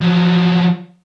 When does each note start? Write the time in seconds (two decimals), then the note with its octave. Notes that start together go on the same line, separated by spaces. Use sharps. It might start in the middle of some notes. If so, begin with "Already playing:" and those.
0.02 F3 F#3